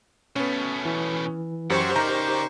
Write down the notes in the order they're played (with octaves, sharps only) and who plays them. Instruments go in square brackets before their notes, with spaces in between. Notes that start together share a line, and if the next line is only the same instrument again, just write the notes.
[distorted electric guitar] B2 A3 [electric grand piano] B3 C#4
[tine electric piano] E3
[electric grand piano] F#2 [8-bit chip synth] G4 C5 C#6 [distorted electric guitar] C#5 F#5
[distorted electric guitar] C#3 D5 [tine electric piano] D#4 A#4 [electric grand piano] A#5 G6